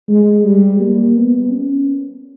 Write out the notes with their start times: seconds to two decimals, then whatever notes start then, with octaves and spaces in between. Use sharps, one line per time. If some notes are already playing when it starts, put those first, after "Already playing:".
0.08 G#3
0.44 G3
0.80 A#3
1.16 B3
1.51 C#4